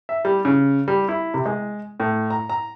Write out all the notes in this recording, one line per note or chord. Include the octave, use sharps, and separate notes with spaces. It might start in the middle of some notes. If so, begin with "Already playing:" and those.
E5
G3
C#3
G3
E4
C3
G#3
A2
A#5
A#5